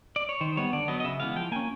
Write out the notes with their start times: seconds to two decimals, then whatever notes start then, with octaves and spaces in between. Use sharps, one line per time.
0.16 D5
0.29 C#5
0.41 D#3 C5
0.57 G3 B3 C#5
0.73 D3 D5
0.88 F#3 B3 D#5
1.00 D#5
1.04 C#3 E5
1.20 E3 G#3 B3 F5
1.36 F3 G5
1.52 A#3 C#4 G#5